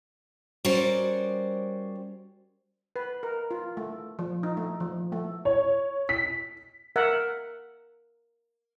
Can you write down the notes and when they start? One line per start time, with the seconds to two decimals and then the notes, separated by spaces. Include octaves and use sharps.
0.65 G3 C#4 F#4 A#4 C5 D5
2.96 B4
3.23 A#4
3.51 F4
3.77 A3
4.19 F3
4.43 D#4
4.57 A3
4.80 F3
5.12 A3
5.45 C#5
6.09 B6
6.96 A#4 E5 F#5